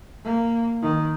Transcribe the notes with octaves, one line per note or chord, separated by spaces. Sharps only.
A#3
D#3